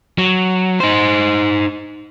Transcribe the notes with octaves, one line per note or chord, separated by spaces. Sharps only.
F#3
D#4 C5